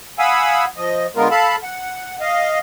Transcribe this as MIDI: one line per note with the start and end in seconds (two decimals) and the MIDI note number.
0.19 0.65 77
0.19 0.65 78
0.19 0.65 80
0.19 0.65 83
0.19 0.65 87
0.19 0.65 88
0.77 1.07 53
0.77 1.07 75
1.16 1.28 50
1.16 1.28 56
1.16 1.28 59
1.16 1.28 65
1.16 1.28 70
1.31 1.56 69
1.31 1.56 77
1.31 1.56 81
1.31 1.56 83
1.63 2.16 78
2.21 2.59 75
2.21 2.59 77